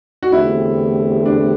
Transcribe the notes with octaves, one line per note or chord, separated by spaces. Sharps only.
F#4
E2 D3 A3 C4 E4 G4
D4